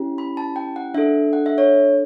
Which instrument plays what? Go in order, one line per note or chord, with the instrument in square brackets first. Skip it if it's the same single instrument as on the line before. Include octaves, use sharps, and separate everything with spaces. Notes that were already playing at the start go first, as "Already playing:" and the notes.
Already playing: [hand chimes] C#4 E4 G4
B5
A5
G5
F#5
D4 A4 E5
F#5
E5
C#5